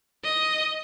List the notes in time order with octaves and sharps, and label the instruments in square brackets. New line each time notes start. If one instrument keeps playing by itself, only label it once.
[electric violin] D#5